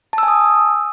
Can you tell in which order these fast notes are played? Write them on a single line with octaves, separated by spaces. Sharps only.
A5 E6 G#5 D#6